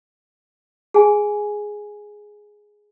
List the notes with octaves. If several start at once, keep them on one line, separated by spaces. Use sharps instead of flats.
G#4 G#5